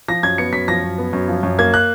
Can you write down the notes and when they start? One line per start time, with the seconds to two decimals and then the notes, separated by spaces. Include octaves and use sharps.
0.08 F3 A#6
0.23 F#2 G#6
0.38 B3 C#7
0.53 F#2 B6
0.68 F3 A#6
0.83 F#2
0.98 B3
1.13 F#2
1.28 F3
1.43 F#2
1.59 A#3 G#6
1.74 F#6